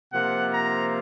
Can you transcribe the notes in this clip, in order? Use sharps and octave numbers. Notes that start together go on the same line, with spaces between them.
C3 F3 A#3 F4 F#5
A#5